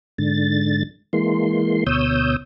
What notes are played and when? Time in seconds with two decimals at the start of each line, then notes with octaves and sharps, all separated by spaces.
0.18 G#2 D3 A6
1.13 E3 G#3 A#3 C6
1.87 D2 B2 C#5 D#6 E6 G6